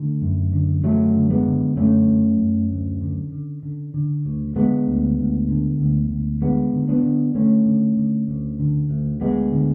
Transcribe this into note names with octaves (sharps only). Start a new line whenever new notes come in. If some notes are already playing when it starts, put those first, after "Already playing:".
Already playing: D3 A3
F#2
D3
F#2 F#3 A3
D3
G#3 B3
D3
F#2 A3 C#4
F#2
F#2
D2
D3
D3
D3
D3
D2
D3 G#3 B3
D2
D2
D3
D2
D2
D3 G#3 B3
D3
B3 D4
D3
D3 A3 C#4
D3
D3
D2
D3
D2
D2 G#3 B3
D3